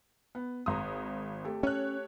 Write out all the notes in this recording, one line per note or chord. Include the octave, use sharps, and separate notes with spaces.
B3
G#1 A#5 C6 D#6
A3 G4 A4
C#4 C#5 F#6